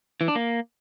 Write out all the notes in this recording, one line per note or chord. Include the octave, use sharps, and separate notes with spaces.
E3
D4
A#3